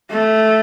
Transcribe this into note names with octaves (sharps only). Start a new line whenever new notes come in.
A3